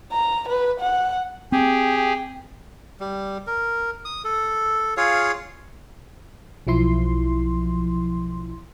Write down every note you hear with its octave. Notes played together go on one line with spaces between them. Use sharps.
A#5
B4
F#5
C4 G4 G#4 G5
G3
A#4
D#6
A4
F4 G#4 C#5 F5
B1 F3 E4 C6